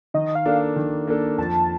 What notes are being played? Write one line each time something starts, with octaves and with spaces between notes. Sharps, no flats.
D#3 D#5
F5
A#3 D4 A4
D#3
A#3 D4 A4
F2 A5